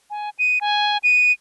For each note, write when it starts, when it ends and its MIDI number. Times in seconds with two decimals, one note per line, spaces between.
0.10 0.30 80
0.39 0.59 99
0.61 0.98 80
1.03 1.32 99